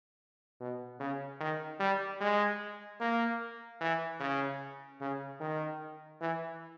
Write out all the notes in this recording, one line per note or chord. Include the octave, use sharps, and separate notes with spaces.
B2
C#3
D#3
G3
G#3
A#3
E3
C#3
C#3
D#3
E3